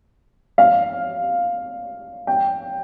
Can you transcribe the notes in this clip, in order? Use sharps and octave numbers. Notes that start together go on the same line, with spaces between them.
F5
G5